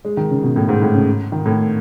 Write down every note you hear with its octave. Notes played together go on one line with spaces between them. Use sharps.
G#3
D#3
C#3
B2
A2
G#2
A2
C#3
D#3
A2